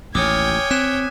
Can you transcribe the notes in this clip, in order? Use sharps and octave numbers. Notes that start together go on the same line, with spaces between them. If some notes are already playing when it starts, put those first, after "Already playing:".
A1 D#2 C#5 G5 G#5 D6 D#6 F6
C4 F#6 B6 E7